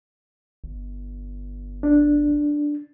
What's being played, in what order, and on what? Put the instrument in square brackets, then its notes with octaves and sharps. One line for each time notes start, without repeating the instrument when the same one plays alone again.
[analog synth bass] G1
[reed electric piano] D4